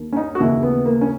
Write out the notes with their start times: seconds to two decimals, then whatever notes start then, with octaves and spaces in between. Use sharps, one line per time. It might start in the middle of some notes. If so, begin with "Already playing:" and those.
Already playing: D#2 D#3
0.13 C#4
0.17 D#4
0.35 F#4
0.40 D#2 C#3 E3 E4
0.63 B3
0.86 A#3
1.01 C#4